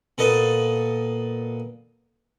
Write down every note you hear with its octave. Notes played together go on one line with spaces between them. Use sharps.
A#2 B3 A4 B4 D#5